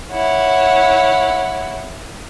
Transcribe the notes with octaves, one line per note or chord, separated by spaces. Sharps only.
E4 C#5 F#5